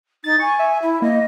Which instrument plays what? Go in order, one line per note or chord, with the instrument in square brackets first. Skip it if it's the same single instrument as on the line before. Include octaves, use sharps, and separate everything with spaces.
[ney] D#4 [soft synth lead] A6
[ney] G#5 [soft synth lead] C#6
[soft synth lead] E5
[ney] E4
[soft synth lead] A#3 [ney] D#5